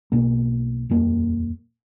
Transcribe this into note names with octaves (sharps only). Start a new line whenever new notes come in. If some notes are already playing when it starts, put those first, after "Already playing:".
B1 B2 A#3
D#1 F2 A#3